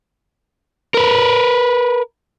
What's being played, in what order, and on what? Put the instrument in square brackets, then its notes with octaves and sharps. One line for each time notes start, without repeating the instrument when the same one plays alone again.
[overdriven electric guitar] A#4 B4